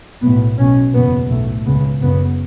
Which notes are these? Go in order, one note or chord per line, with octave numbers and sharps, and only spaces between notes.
B1 A2 B3
B1 B2 C#4
F#1 E2 B2 B3
B1 A2 A3
C#2 C#3 B3
F#1 F#2 C#3 B3